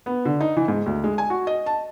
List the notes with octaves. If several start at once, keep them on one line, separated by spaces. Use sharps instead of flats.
B3
D3
D#4
E3
G#2
D2
G#3
G#5
F#4
D#5
A5